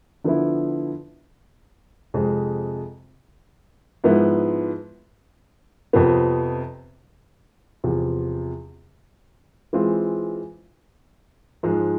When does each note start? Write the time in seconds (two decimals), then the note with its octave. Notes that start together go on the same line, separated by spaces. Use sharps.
0.24 D3 F3 B3 E4
2.14 F2 C3 G#3
4.04 G#2 F3 B3 E4
5.93 F2 C3 F3 B3
7.84 E2 C3 F3
9.73 E3 G#3 C4 F4
11.63 G#2 F3 G#3